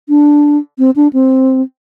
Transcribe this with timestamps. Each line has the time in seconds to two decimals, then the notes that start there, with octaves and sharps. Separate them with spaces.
0.09 D4
0.79 C4
0.96 D4
1.13 C4